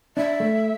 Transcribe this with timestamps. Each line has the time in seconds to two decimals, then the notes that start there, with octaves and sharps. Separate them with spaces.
0.17 D4 E5
0.40 A3